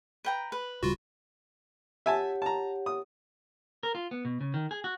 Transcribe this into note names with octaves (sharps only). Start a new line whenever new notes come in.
B4 G5 A#5
B4
D1 C#3 G3 F4 F#4
G4 C#5 E5 F#5 G#5 A5
A5 A#5
D#6
A#4
F4
B3
B2
C#3
D#3
G#4
F#4